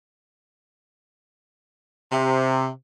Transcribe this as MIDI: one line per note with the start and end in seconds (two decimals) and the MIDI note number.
2.12 2.69 48